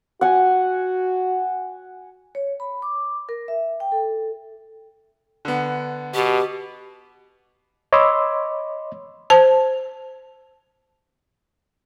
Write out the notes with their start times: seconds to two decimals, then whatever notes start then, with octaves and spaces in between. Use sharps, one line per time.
0.21 F#4 F#5 G#5
2.35 C#5
2.60 B5
2.82 D6
3.29 A#4
3.48 E5
3.80 G5
3.92 A4
5.45 D3 B3
6.14 B2 G4
7.93 C#5 D#5 B5 C6 D6 E6
9.30 C5 A5